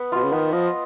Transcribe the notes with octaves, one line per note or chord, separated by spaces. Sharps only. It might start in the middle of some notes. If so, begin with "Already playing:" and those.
Already playing: B3
B2 F4
C#3
D#3 B3
F3 D#5